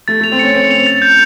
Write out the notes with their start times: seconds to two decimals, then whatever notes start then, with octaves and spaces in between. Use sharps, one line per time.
0.08 A3 A6
0.20 A3 F7
0.32 C4
0.39 C#4 C#7
0.55 C4 C#7
0.71 F7
0.87 A6
1.02 G6